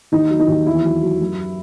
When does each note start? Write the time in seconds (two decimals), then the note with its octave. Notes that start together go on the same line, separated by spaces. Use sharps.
0.12 D#2 D#4
0.30 F#3
0.40 D#4
0.48 D#2
0.66 E2 E4
0.84 F#3
1.02 F#3
1.21 F#2